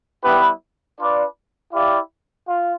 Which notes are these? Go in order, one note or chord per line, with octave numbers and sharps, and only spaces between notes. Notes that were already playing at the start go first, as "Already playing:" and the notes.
G3 B3 E4 G4 B4
D4 F4 B4 D5
E4 G4 D5 F5
F4